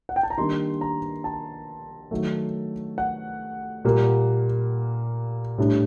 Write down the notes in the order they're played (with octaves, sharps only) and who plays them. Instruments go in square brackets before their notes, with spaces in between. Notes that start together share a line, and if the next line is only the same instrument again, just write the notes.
[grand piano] F#5
G5
A5
A#5
D#3 G3 A#3 D4 C6
A#5
A5
D#3 F#3 A3
F#5
A#2 G3 A#3
A2 G3 D4